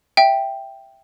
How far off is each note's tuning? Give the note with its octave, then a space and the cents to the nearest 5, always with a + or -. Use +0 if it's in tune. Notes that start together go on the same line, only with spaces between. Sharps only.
E5 +0 G5 +0